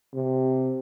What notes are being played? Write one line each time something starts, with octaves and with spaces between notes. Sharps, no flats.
C3